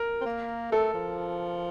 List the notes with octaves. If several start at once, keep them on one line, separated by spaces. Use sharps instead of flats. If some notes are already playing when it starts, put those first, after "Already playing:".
Already playing: A#4
C4
A#3
A3 A4
F3